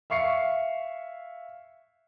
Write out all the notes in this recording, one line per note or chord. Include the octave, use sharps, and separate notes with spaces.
E5 F5 C#6 C7 C#7